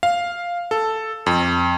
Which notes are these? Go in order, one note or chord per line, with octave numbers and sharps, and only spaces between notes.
F5
A4
F2